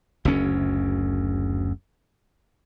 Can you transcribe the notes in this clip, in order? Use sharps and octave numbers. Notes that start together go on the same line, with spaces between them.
F#1 D2 C#4